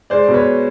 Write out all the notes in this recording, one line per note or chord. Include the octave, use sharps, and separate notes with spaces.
G#3 C5 D5
B2
B4 C#5